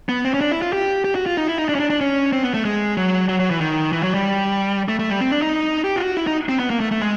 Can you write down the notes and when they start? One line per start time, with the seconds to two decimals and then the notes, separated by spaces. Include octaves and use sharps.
0.09 B3
0.25 C4
0.34 C#4
0.41 D4
0.52 E4
0.62 F4
0.73 G4
1.04 G4
1.15 F#4
1.26 F4
1.37 D#4
1.48 E4
1.58 D#4
1.69 D4
1.75 C#4
1.80 D4
1.90 D4
2.01 C#4
2.33 C4
2.44 B3
2.54 A3
2.65 G#3
2.97 F#3
3.29 F#3
3.40 F#3
3.50 E3
3.61 D#3
3.93 E3
4.03 F#3
4.14 G3
4.89 A3
4.99 A3
5.10 G3
5.21 C4
5.31 D4
5.42 D#4
5.84 G4
5.96 F4
6.00 F#4
6.17 E4
6.27 D#4
6.49 C4
6.59 B3
6.70 A#3
6.80 A3
6.91 A3
7.02 G#3